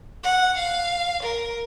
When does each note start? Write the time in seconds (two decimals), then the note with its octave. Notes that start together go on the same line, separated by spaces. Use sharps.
0.23 F#5
0.56 F5
1.22 A#4